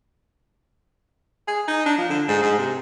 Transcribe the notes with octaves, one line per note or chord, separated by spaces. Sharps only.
G#4
D#4
D4
F3
D3
G#2
G#2
C3